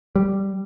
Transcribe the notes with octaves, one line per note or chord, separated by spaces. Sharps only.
G3